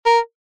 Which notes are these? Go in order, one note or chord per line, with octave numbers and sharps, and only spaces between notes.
A#4